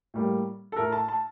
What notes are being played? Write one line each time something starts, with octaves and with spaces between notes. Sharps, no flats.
A2 G3 A#3
A4
A2 A3 A#4
A5
A5